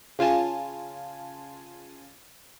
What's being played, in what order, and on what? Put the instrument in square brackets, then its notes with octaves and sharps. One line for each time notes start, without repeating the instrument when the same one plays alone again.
[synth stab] C#3 F4 G#5 A5